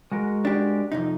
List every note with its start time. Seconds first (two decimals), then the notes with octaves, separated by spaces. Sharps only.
0.11 G#3 F#4 A#4
0.45 D4 G4
0.92 F2 C3 D#4